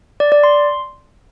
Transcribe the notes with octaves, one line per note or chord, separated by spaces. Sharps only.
D5
D5
C6